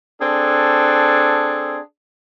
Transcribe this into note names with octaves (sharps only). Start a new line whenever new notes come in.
C4 D4 G#4 A4